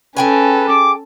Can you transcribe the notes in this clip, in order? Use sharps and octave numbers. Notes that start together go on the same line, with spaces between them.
C#4 G#4 A4 B4 G5 G#5
D6